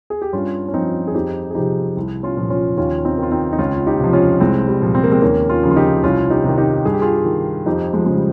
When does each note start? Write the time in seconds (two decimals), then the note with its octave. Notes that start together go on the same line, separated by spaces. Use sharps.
0.10 G#4
0.22 G4
0.33 G2 C#4 F4
0.68 C#4
0.74 F3 C4 D#4
1.07 G#4
1.15 F2 D#4 G4
1.50 G#4
1.55 C3 F3 D#4 G4
1.97 C2
2.23 C#4 F4
2.37 A#2 F3
2.50 C#4 F4
2.77 D#2 C#4 F4
2.99 F4
3.05 C4 D#4
3.18 D#3 F4
3.31 C4 D#4
3.53 D#4
3.58 C#2 C#4 F4
3.87 D#4 G4
4.00 C3 F3
4.13 C#4 F4
4.40 C2 G#3 C4
4.68 G3
4.81 A#2 F3
4.95 C4
5.04 A#3
5.12 G#3 C4
5.22 D#2 A#3 C#4
5.49 C#4 F4
5.63 C#3 F3
5.71 F4
5.76 D#4 G4
6.03 C2 C#4 F4
6.30 D#4 G4
6.44 C3 D#3
6.58 D#4 G4
6.85 G2 G#4
6.94 G4
7.02 F4 G#4
7.25 D#3
7.66 F2 D#4 G4
7.93 F3 G#3
8.06 C#3 F3 G#3
8.14 G3